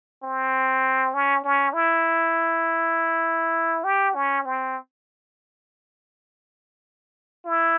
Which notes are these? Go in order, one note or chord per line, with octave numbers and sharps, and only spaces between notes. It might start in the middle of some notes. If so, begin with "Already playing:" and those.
C4
C#4
C#4
E4
G4
C#4
C4
E4